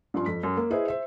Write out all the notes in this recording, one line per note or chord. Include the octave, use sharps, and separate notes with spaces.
G2 F3 C#4 C6
F2 B6
F#2
A#3
E4 G#4 B4 C5 D#5 E5
C5 E5